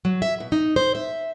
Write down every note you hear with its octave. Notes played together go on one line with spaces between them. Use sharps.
F#3
E5
B2
D#4
C5
E5